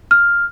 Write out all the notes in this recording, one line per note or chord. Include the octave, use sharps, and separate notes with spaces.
F6